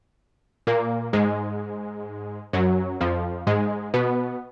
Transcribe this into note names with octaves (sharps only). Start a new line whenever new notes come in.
A#2 A#3
G#2 G#3
F#2 F#3
F2 F3
G#2 G#3
B2 B3